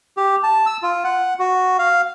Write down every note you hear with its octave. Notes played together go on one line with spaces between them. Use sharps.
G4
A5
E6
F4
F#5
F#4
F5